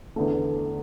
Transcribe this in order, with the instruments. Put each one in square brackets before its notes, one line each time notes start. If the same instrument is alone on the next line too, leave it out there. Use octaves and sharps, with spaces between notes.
[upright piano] E2 D3 A3